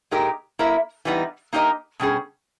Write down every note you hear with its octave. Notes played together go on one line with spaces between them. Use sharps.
A#2 G#3 D#4 G4 A#4
A#3 E4 A#4 E5
E3 G3 B3 D#4
A#3 D#4 G4 A#4 D#5
B2 G3 C#4 G#4